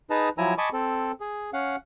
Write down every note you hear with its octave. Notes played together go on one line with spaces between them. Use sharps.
D#4 G#4 B4 A5 A#5
F3 F#3 E4 G#5 A#5 E6
D#5 G#5 A5 B5 C#6 D6
C4 A4
G#4
C#4 F5 F#5